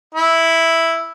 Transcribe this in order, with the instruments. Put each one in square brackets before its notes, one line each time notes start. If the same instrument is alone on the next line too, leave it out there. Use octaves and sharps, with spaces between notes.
[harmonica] E4